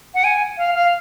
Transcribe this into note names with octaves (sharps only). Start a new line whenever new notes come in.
F#5
G#5
F5
F5